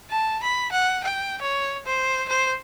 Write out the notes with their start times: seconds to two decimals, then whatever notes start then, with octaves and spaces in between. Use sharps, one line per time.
0.11 A5
0.43 B5
0.72 F#5
1.04 G5
1.41 C#5
1.86 C5
2.29 C5